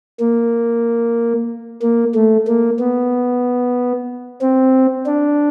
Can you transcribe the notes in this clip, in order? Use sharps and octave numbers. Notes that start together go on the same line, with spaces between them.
A#3
A#3
A3
A#3
B3
C4
D4